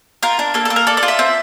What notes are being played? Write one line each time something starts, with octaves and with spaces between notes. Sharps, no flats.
F4 A#4
D4
A#3 A4
A4
A#3
A#4
A4 D5
D5
F4
E5
C4